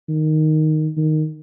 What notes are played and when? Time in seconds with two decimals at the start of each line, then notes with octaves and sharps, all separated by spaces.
0.09 D#3
0.97 D#3